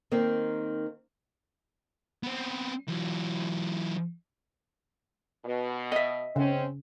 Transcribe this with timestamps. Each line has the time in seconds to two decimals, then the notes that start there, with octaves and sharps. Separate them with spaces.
0.12 D#3 A#3 C4
2.23 B3 C4
2.88 E3 F#3
5.45 B2
5.92 D#5 E5
6.36 C#3 C4 C#4